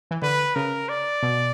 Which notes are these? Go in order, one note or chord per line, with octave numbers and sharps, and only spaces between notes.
E3
D3 B4
C#3 A#4
D5
B2